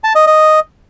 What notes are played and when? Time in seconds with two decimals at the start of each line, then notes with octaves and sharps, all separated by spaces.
0.04 A5
0.15 D#5
0.27 D#5